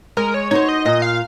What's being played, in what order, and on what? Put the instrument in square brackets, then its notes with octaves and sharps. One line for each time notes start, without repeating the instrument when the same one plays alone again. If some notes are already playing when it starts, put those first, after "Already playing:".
[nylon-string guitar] G#3 [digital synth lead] A#4
[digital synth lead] C#5
[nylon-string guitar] D#4 F#4 C5 [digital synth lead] C#5
[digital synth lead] D#5
[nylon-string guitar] A#2 [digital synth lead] D#5
[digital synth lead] F5